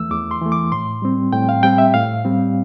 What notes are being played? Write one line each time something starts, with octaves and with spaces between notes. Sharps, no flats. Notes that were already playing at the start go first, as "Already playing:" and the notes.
Already playing: E2 E3 A3 E6
E2 D6
C6
E3 A3
D6
A2 C6
G3 C4
A2 G5
F5
G3 C4 G5
E5
A2 F5
G3 C4